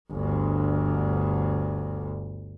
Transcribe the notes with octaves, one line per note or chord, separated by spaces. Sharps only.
G1 D2